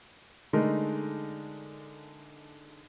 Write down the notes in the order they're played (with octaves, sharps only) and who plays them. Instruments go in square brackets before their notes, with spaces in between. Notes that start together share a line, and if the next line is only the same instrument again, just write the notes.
[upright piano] D3 G#3 A3 D#4 A#4